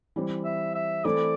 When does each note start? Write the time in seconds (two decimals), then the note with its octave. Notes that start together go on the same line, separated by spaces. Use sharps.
0.16 E3 G3 C4
0.45 E5
0.75 E5
1.04 E3 A3 C4 E4 A4 D5